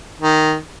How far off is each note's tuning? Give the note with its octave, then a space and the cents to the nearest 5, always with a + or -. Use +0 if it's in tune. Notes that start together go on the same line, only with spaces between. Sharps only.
D#3 +0